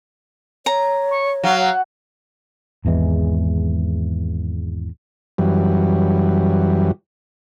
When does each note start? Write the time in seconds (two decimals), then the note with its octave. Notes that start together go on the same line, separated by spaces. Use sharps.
0.66 C#5 A#5
1.11 C#6
1.44 F#3 F5
2.85 G#1 E2 E3 G#3
5.38 F#2 E3 G3